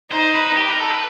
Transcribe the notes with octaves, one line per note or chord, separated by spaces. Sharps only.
D#4 C5
B4
G4
A#4
A4
B4